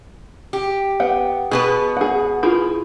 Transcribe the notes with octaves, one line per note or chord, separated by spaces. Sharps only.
G4
B3 F#5 G5
B2 B3 G#4 B4
G#4 F#5
E4 F4 G#4